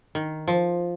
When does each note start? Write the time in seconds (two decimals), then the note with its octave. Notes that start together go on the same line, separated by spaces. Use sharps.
0.15 D#3
0.48 F3